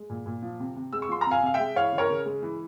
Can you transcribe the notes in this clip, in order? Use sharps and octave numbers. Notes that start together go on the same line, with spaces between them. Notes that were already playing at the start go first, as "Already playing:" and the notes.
Already playing: G#3
A#2
A#2
F3
C3
C3
G#3 E6
C#6
F3 C6
C3 A#5
F5 G#5
C3 F5
E5 G5
G#3
E3 C#5 F5
C#3
A#4 C#5
C#3
G#3
E3